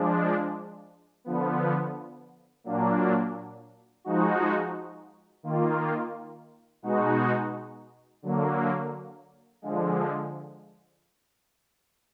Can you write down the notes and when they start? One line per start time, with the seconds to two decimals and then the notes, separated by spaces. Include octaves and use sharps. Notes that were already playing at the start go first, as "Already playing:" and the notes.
Already playing: F3 G#3 D4
1.24 D3 F3 B3
2.64 A#2 F#3 A#3 D4
4.04 F3 G#3 D#4 F#4
5.43 D#3 A#3 F4
6.82 B2 G#3 D#4 F#4
8.22 D3 F#3 A#3
9.62 D3 F3 G#3